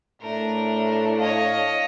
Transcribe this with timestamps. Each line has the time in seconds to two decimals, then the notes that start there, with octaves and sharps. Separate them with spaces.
0.22 A2 A3 D4 A#4
1.19 C#5 D#5 F5